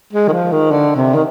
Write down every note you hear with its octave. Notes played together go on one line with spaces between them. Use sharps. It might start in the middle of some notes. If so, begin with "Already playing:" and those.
G#3
D#3
F3
D#3
D3
C3
D#3